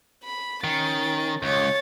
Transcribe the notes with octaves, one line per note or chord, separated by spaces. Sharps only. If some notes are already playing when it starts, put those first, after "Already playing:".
B5
D#3 C#4 A6
C#2 C#5 A6